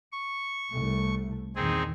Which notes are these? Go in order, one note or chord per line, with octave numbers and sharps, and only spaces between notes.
C#6
C2 A3
E2 A#2 D#3 C4 D#4 G#4